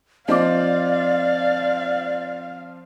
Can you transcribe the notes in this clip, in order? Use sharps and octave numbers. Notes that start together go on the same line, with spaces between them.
F3 C4 F4 D5 D#5 F5 D6